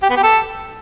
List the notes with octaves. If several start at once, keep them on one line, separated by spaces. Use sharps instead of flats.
G4
B3
G4
A4